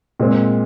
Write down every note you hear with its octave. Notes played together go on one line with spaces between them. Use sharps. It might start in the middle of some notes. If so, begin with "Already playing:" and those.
A#2 G#3 C4